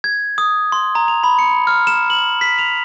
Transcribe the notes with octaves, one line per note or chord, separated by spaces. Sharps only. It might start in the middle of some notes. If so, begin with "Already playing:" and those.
G#6
D#6
C6
A#5
F7
B5
C#7
F6
E7
F#7
B6
F7